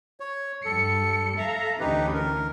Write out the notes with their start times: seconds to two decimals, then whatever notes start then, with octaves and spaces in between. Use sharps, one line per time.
0.20 C#5
0.65 G2 G3 A4 C#7
1.37 A4 E5 F5 A#5
1.80 D2 E3 C#4 D#4 G4 B4
2.14 A#4